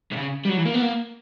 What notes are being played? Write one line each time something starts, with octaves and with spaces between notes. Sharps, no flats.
C3
C#3
G3
F#3
E3
A#3
B3
A#3